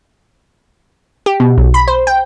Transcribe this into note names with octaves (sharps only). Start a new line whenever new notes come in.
G4
B2
B1
B5
C5
G5